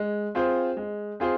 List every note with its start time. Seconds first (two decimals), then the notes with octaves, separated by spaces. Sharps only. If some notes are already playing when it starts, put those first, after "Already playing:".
Already playing: G#3
0.35 C4 F4 G#4 C5
0.77 G#3
1.20 C4 F4 G#4 C5